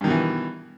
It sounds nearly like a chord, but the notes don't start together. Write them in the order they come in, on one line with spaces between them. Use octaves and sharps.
G2 D#3 B2 E3